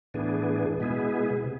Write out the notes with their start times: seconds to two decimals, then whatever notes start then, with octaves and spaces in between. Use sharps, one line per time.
0.14 A2 E3 B3 D4 G#4
0.79 B2 G#3 B3 E4 G#4
1.44 C3